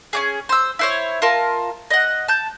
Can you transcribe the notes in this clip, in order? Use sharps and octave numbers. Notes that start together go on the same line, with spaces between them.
C#4 D4 G#4
C5 E6
E4 C5 C#5
F4 A#4 A5
D#5 F#5
A5 G6